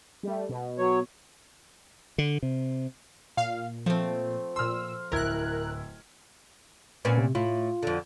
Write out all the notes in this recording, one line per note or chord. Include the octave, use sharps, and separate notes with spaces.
G3 A3
B2
F#3 C#5
D3
C3
A#2 F5
F3 A3 C4
A#2 C6 E6 F6
D1 E4 A#4 F#6 G#6
A#2 C4 C#4 B4
C3
A2 E4 F4
F2 D3